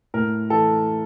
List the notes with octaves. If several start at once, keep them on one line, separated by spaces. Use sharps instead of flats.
A2 A#4
E3 A4